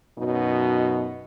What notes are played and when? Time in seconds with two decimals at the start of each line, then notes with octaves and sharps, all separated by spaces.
0.19 F#2 B2 F#3 D#4